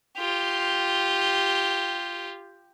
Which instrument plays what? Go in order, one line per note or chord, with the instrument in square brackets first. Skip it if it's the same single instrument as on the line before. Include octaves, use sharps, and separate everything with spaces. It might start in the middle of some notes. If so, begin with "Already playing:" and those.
[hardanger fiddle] F4 G4